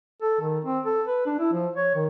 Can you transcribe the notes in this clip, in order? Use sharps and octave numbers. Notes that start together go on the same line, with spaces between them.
A4
D#3
C4
A4
B4
D4
E4
F3
C#5
D#3